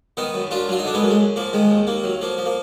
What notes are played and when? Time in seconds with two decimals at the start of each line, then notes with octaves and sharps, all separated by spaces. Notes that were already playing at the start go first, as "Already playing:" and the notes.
0.17 D#3 B3 D#4
0.34 F#2
0.51 F#2 D4 F4
0.68 F#3 F4
0.79 D#4
0.85 D3 D4
0.94 G#3 B3
1.02 F#2 A#3
1.10 G#3
1.19 F#2
1.36 F3 A#3
1.53 D#3 G#3
1.70 D#2
1.87 D#2 A#3
2.04 F#3
2.21 F3 A#3
2.38 F3
2.45 A#3